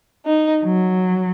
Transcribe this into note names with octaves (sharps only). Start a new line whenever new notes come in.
D#4
F#3